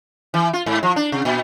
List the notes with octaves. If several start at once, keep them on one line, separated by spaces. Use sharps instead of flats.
E3
F4
G#2
F3
D4
C3
A#2